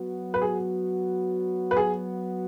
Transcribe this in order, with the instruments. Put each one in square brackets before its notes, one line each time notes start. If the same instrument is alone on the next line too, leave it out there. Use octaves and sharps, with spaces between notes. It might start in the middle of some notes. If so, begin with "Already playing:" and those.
Already playing: [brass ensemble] F#3 B3 F#4
[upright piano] B4
G#4
B4
G#4